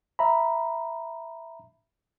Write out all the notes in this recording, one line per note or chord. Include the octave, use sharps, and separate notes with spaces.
E5 A#5 B5